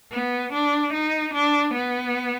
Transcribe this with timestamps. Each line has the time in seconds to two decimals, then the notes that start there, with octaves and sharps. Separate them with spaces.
0.12 B3
0.53 D4
0.93 D#4
1.34 D4
1.74 B3